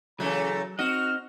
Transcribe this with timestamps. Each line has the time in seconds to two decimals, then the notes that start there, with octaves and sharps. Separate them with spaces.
0.20 C#3 E3 F#3 A3 A#5
0.79 C4 D#4 F#4 D#5 F6